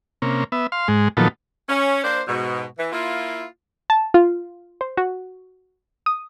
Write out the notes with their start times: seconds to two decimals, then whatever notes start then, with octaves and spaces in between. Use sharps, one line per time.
0.22 C3 A#3 C#4
0.52 B3 E5
0.72 F5 C6
0.88 G#2 G#3
1.17 A#2 D#3 F3 F#3 B3 A4
1.69 C#4
2.03 A#3 D4 C5
2.27 G#2 B2
2.78 E3
2.92 A#3 E4 F4
3.90 A5
4.14 F4
4.81 C5
4.97 F#4
6.06 D#6